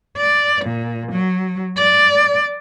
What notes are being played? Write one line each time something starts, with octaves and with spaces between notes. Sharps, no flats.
D5
A#2
F#3
D5